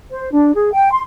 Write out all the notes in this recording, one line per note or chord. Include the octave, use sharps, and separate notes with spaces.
C5
D4
G#4
G5
C6